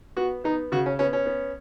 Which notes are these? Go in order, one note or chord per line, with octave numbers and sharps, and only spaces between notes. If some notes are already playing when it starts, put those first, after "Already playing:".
B3 F#4
B3 D#4
C#3 F#4
C#4
B3 C#4
C#4
B3